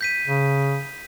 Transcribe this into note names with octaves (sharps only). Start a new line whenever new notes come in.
G6 B6 D#7
C#3